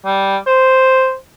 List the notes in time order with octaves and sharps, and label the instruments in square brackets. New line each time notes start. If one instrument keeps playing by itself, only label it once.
[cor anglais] G3
C5